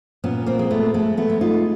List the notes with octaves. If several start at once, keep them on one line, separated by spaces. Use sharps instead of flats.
A#2 B3 C#4
A#3 C4
G#3
A3 B3
G#3 A3 B3
A3 B3
G#3
D#4 F4